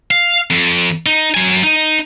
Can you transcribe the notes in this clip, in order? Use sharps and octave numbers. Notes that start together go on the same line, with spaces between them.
F5
F2
D#4
F#3 G#5
D#4